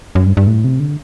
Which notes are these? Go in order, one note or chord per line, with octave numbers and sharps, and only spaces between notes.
F#2
G2
G2
A2
C3
D3